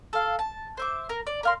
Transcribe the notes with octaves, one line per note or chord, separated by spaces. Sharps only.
A4 F5
A5
C5 E5 D6
A#4
D5
A#4 F5 C6